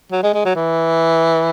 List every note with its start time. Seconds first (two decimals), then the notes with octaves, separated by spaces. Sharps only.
0.12 F#3
0.23 G#3
0.34 G#3
0.45 F#3
0.56 E3